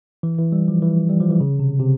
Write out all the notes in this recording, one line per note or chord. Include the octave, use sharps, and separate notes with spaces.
E3
E3
G3
F3
E3
G3
F3
E3
C#3
C3
C3